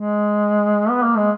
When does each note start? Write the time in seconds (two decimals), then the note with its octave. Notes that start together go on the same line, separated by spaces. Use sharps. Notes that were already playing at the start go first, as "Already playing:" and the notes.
Already playing: G#3
0.90 B3
1.03 A#3
1.17 G#3